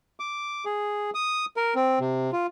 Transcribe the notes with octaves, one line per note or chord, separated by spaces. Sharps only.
D6
G#4
D#6
A#4
C4
C3
F4